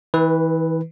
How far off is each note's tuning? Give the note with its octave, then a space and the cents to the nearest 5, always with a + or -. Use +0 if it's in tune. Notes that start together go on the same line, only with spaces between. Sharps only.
E3 -35 B4 +0